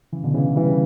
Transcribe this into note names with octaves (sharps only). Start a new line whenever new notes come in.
C#3 E3
B2 D3
C#3 E3
E3 G3
C#3